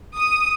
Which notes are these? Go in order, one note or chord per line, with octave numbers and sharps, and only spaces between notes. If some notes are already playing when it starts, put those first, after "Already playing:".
D#6